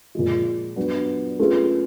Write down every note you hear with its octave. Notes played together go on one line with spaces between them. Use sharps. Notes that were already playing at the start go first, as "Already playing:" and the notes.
A#2 F3 G#3
F#3 B3 D4
A3 C#4 F4 G#4 B4